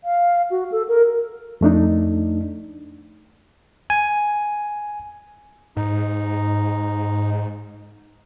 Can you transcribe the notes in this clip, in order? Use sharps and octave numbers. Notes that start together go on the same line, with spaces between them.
F5
F#4
A4
A#4
F2 A3 D4 D#4
G#5
G#2 D#4